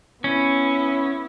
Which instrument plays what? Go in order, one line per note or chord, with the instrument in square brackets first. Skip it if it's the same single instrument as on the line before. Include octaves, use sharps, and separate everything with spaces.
[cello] B3 E4 [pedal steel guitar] C#4